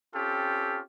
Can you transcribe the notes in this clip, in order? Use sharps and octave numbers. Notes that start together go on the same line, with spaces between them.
C4 C#4 F4 G4 A4